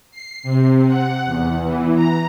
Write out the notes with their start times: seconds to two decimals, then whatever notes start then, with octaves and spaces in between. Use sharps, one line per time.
0.11 C7
0.43 C3
0.87 F#5
1.25 E2
1.63 E3
1.95 A#5